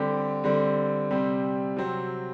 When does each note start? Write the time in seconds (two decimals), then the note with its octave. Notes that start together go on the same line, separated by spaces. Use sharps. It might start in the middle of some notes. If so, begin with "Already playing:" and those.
Already playing: D3 G3 C4 G4
0.44 D3 G3 C4
1.11 C3 G3 C4
1.77 C3 F#3 C4